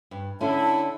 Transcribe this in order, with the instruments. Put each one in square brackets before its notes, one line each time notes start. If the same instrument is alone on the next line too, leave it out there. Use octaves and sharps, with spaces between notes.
[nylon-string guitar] G2
[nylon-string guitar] D3 C#4 [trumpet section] E4 [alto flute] A5